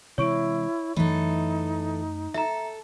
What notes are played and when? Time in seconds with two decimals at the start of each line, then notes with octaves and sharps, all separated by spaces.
0.18 C3 E3 G#3 E4 C#5 C#6 D7
0.96 F#2 E3 A3 D#4 A4
2.34 A4 E5 A#5